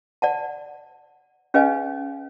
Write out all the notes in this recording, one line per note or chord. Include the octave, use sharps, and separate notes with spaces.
D5 F#5 A5
C#4 G#4 B4 D#5 F5 G#5